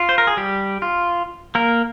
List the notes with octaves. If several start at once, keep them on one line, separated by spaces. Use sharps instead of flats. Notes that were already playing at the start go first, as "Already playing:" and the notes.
Already playing: F4
C5
A#4
G#4
G3 G4
F4
A#3 A#4